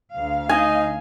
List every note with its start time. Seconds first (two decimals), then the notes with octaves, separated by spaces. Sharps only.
0.16 D2 F5
0.49 D#4 D#5 G#5